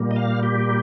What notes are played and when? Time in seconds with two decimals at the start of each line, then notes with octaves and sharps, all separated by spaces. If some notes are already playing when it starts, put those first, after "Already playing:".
Already playing: A#2 G3 A#3
0.11 D#5
0.16 F5
0.43 G4